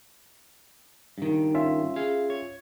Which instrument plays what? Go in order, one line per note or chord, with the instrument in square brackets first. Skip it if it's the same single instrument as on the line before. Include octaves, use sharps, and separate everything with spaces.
[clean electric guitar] G2 D#3
[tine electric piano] C#4 F4 E5
[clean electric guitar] G#4 F5
C#5